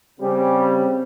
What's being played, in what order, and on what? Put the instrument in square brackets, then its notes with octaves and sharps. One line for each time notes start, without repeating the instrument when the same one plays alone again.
[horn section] C#3 G3 [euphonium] C4